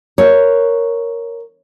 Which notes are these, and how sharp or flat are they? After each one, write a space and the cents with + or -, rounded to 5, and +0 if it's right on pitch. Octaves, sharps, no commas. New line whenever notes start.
A#4 +0 C#5 +0